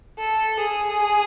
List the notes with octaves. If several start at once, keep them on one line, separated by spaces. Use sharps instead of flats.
A4
G#4